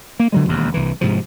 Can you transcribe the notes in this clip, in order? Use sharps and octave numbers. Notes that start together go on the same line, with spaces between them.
A#3
D3 F#3 G#3
E1 D#2
C2 E3
G#2 C3 F3